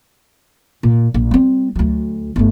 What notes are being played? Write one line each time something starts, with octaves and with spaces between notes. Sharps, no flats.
A#2
A#1
G3 C4
D2 F#3
G1 A3